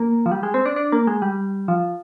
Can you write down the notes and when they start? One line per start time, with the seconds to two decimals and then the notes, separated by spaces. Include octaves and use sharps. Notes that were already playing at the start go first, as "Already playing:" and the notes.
Already playing: A#3
0.26 F3
0.32 G3
0.43 G#3
0.54 C4
0.66 D4
0.76 D4
0.92 A#3
1.07 G#3
1.22 G3
1.68 F3